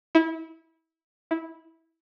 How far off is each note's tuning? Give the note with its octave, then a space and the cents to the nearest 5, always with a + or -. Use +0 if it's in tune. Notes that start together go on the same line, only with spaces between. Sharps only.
E4 -25
E4 -15